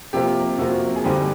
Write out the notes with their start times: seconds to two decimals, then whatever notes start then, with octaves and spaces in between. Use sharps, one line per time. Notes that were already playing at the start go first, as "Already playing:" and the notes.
0.13 C3 F3 A#3 G4
0.59 C3 F3 A#3 F#4
0.96 G#4
1.04 G2 D3 G3 C4 D#4 G4